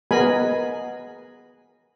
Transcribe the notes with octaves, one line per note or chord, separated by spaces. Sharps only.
B3 G#4 A#4 D#5 G#5 B5